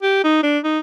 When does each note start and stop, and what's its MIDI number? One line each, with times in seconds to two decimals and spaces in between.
0.02 0.21 67
0.24 0.39 63
0.43 0.58 62
0.64 0.79 63